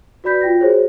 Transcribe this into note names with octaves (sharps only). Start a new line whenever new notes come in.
F#4 B4 D5 B5 G6 B6
F4 G5 A#6
F#4 G#4 A#4 C5 C#5